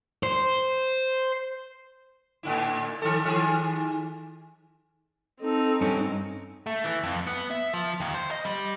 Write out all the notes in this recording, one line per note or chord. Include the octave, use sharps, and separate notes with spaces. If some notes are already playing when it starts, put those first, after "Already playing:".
C5
A2 D3 E4
D#3 A4
D#3 G#4
C4 D#4 A4
G2 C#4 A4
A3
E3
F2
B3
E5
F3
D#2
C5
D#5
G3